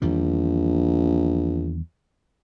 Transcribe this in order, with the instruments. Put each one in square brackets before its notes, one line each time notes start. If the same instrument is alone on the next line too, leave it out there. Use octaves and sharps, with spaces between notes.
[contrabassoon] A#1 [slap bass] E2 D#3 G3